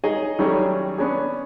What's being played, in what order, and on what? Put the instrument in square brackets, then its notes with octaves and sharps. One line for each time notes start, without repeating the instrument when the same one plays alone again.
[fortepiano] D#4 G#4 C#5 D#5
D#3 F#3 G3 A3 C#4 G#4
B3 C#4 D4 G#4